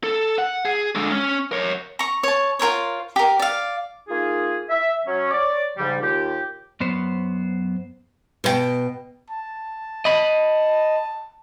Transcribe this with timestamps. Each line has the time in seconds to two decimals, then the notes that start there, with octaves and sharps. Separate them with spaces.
0.04 A4
0.38 F#5
0.65 G#4
0.95 D3 G#3
1.12 C#4
1.52 A#4 C#5
1.99 A#5 C#6
2.23 C#5 A5
2.59 F4 A#4 C5 C#5
3.16 G4 A#4
3.39 D5 F5
4.08 A#3 D#4 F4 G#4
4.70 E5
5.06 F#3 C#4
5.31 C#5 D5
5.77 G#2 C#3 F3 G3
6.00 D#2 D#4 F4 G4
6.80 F#2 B3 C5
8.44 B2 C5 G5
9.30 A5
10.05 D#5 B5